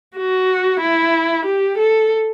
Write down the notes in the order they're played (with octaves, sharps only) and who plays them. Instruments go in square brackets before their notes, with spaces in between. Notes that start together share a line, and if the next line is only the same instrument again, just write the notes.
[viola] F#4
E4
G4
A4